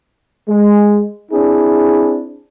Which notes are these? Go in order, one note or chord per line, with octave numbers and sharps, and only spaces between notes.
G#3
C4 D4 E4 G#4